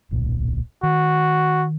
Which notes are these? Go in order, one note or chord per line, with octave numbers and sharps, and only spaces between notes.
D1 B1 A#2
D#3 F#4